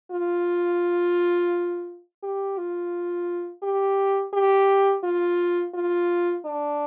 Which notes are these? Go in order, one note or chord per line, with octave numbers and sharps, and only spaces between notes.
F4
G4
F4
G4
G4
F4
F4
D4